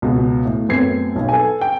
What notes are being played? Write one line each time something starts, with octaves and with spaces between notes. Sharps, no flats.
C#2 B2
A2
F#2 A3 B3 C4 G#6 C7
B1
A4 B4 G#5
G5